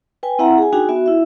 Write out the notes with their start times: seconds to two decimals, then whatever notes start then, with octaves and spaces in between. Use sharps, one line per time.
0.23 B4 G5 G#5
0.39 C4 E4 E5 F#5 A#5
0.58 G#4 G#5
0.73 D4 D#4 F#4 G#4 G5 G#5
0.89 B3 F#4 E5
1.06 E4 E5